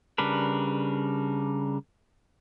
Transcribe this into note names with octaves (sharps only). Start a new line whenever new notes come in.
C#3 G3 D4 A#4 B4